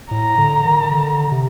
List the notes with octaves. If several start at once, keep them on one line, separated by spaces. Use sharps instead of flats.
A2 A#5
D3
D#3
D3
C3